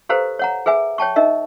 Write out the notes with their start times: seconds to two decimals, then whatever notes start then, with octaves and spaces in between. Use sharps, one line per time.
0.09 G4 A4 B4 C5 F5 A#5
0.39 C#5 F#5 A#5
0.66 G#4 B4 E5 G#5
0.98 C#5 G5 A5 C#6
1.16 D#4 A#4 D#5 E5